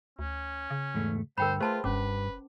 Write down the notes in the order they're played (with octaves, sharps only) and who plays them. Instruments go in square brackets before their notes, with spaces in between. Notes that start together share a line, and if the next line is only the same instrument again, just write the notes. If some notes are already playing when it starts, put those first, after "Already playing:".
[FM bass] D2 [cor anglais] C#4
[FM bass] C#3
[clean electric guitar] E2 G#2 A3
[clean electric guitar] D2 G2 [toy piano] A#4 G5 B5 [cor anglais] C5
[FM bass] A3 [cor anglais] F4 [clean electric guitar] G#4 B4 [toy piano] C5 A5 C6
[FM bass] F#1 [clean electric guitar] G2 [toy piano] C#4 D6 [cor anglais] B4